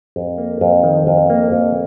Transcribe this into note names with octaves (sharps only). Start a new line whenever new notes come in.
F2
A#3
F2
D#3
F2
A#3
F2